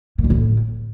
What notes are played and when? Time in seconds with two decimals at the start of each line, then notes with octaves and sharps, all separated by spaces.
0.18 A#2
0.24 D3
0.30 A2